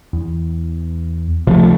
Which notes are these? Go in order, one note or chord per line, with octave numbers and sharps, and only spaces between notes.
E2
C#2 C3 F3 A3